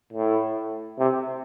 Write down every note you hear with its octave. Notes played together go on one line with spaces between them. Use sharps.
A2
C3